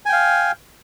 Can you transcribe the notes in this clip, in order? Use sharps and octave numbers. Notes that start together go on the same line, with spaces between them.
F5 G5 G#5